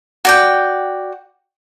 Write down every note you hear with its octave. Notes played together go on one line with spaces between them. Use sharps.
F#4 D5 G5